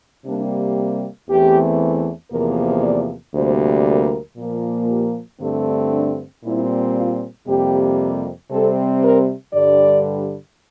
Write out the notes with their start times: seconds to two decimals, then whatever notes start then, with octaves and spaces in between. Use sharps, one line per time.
0.25 C3 G3 A#3 D4
1.28 E2 E3 A3 C4 G4
2.31 E2 C3 F3 A#3 A#4
2.82 D5
3.34 D2 C3 G3 A#3 C5
3.86 A#4
4.37 A#2 F3 A#3
4.89 G4
5.40 G2 D3 A3 C4 G4
5.92 D4
6.44 A#2 G3 C4 E4
6.95 F4
7.47 F2 C3 G3 A#3 G4
8.50 C3 G3 C4 A4
9.01 A#4
9.53 G2 D3 G3 D5